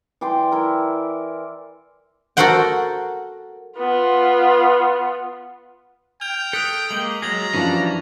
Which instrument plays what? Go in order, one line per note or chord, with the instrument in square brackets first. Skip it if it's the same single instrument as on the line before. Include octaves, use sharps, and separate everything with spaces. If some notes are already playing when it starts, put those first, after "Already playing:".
[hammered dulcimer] E3 D5 G5 C6
E4 A#4
[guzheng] F#4 A4 A#4 C5 F#5 G5
[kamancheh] B3 F4
[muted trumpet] G5 [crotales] F6 G#6 F7
[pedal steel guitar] A4 F#6 [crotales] D#6 B6
[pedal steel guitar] G#3 A#3 D#5 [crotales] F#7
[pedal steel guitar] F#3 G#3 G#4 [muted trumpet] A#5 [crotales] D#6 G#6 A6
[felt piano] F#2 F3 [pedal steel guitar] E3 G3 D4 [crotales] C#6